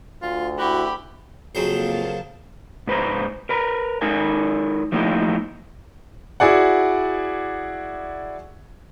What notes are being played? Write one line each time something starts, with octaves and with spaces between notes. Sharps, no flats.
D2 F4
E4 F#4 G4 B5
F2 C#3 F#3 A#3 C5 A5
G#2 B4 C5 A#5
A#4 B4 A#5
G#3 D#4 A4 A#4 G#5
F3 A3 A#3 D#4 E4 G4
E4 F#4 G#4 D5 F#5